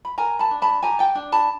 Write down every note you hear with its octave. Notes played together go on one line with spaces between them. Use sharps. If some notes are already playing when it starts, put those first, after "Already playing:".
B5
A#4 G#5 A#5
A5 B5
D4
A5 B5
G4 G#5 A#5
G5 A5
D4
A5 B5